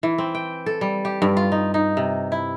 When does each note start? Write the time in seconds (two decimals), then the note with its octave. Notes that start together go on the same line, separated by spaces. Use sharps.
0.03 E3
0.18 C4
0.35 G5
0.66 A4
0.81 G3
1.05 G4
1.22 G2
1.37 F4
1.52 D#4
1.74 D#4
1.97 C3
2.32 E4